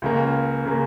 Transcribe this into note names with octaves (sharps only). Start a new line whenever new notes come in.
C#2 C#3 A#3
C#3 A#3